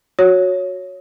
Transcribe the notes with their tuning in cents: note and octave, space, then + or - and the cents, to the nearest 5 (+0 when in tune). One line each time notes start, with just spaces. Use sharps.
F#4 -10 C#5 +0